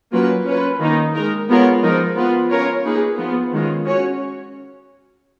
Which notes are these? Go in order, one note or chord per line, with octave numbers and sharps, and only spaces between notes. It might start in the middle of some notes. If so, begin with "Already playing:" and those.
F#3 A#3 C#4 F4 B4
C#4 F4 B4
D#3 A#3 D#4
G#3 D#4 A#4
G#3 B3 F4 A#4 C#5
F3 G#3 D#4 A#4
B3 F4 B4
C#4 F4 A#4 C#5
A#3 D#4 G#4 B4
F3 B3 F4
D#3 G#3 C#4 F4
C#4 F#4 C#5